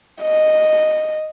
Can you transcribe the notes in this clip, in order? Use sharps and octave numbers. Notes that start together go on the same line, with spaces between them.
D#5